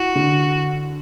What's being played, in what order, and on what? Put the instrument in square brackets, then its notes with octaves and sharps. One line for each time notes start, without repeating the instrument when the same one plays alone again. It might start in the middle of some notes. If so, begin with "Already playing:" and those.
Already playing: [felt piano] E4 [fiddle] F#4
[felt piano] D3